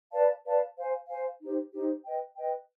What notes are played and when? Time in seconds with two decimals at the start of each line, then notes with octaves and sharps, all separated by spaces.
0.12 B4 D5 F5 A5
0.44 B4 D5 F5 A5
0.76 C5 F5 G#5
1.08 C5 F5 G#5
1.40 D#4 G4 C5
1.72 D#4 G4 C5
2.05 B4 D#5 G5
2.36 B4 D#5 G5